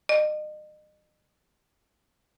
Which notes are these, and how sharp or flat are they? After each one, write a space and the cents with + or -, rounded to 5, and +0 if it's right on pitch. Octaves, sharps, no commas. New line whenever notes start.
D#5 -35